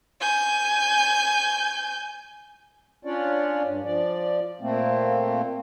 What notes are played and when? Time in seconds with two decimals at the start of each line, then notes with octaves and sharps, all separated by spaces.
0.20 G#5 G6
3.05 C#4 D4 F4 C#5 D5
3.64 G2
3.83 F3 D5
4.61 A#2 A3 A#3 C4